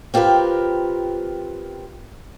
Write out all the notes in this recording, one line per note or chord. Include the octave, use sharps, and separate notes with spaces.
C4 F4 G4 A#4 B4